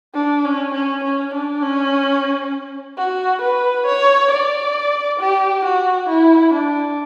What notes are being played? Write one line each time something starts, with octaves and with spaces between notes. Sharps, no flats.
D4
C#4
C#4
C#4
D4
C#4
F#4
B4
C#5
D5
G4
F#4
E4
D4